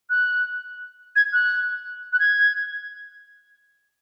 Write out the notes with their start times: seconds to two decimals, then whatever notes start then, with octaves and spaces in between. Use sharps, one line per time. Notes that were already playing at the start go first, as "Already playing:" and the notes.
0.10 F#6
1.16 G#6
1.33 F#6
2.13 F#6
2.20 G#6